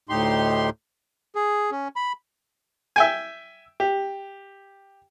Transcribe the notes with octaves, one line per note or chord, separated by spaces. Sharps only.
D2 A2 D#4 G4 C6
G#4
C#4
B5
E5 G5 G#5
G4